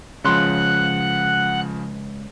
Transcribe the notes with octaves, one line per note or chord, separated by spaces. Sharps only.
C#2 C#3 F3 F#5 C6 F#6